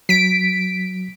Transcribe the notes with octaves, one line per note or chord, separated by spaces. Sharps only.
F#3 B6 D7